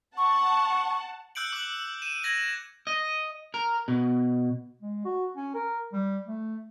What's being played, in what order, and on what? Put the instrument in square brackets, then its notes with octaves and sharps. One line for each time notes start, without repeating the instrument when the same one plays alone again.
[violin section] F#5 A5 [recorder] C#6
[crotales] E6 F#6 G6 C#7 D7 F#7
D6 F#6 F#7
D#7 E7
G#6 A#6 F#7
[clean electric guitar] D#5
A#4
B2
[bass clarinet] G#3
F#4
C#4
A#4
G3
A3